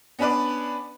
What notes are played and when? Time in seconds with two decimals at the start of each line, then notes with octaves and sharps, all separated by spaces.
0.19 B3 C#4 D4 B4 D5